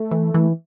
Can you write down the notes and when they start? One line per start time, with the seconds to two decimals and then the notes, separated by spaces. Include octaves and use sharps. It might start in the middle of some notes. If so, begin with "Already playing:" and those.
Already playing: A3
0.11 E3
0.34 E3